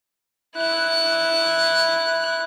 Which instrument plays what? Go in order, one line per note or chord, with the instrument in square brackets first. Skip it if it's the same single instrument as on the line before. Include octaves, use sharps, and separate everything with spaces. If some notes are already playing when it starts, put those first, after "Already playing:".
[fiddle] E4 F#6